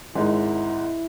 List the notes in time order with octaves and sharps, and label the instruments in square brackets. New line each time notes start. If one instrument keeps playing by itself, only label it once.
[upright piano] G#1 G#2 G#3 [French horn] E4